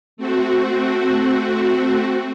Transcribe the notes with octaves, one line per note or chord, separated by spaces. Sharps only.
A3 C4 F#4